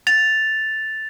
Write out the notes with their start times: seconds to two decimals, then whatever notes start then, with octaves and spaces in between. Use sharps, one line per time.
0.07 A6 F7